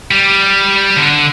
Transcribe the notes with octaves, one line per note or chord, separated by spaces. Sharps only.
G3
D3